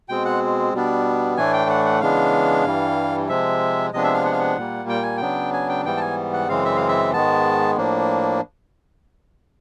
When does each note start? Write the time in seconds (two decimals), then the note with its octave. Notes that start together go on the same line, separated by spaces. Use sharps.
0.09 B2 G#3 C4 G5
0.25 F#5
0.74 B2 G3 B3 D4
1.37 A2 E3 A3 D4 G#5
1.54 G5
1.70 F#5
1.85 F#5
2.01 C#3 E3 G#3 B3 D4 F5
2.65 G2 E3 G3
3.29 C3 F3 G#3 E5
3.93 C3 F3 G#3 B3 D4 D#5
4.04 E5
4.14 F5
4.25 F#5
4.33 F5
4.40 F#5
4.57 A#2 G3 A#3
4.89 G5
5.03 G#5
5.17 C#3 F#3 B3 D4 G5
5.53 G#5
5.69 G5
5.85 G#2 E3 G3 B3 G5
5.97 A5
6.01 G#5
6.33 F#5
6.49 F#2 C#3 E3 G#3 C4 F5
6.65 E5
6.76 F5
6.89 E5
7.13 G#2 D#3 G#3 B3 A5
7.77 A2 F3 A#3 D4